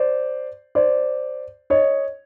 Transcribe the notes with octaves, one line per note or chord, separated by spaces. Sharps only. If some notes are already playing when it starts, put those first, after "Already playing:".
Already playing: C5 D5
C5 D5
C#5 D#5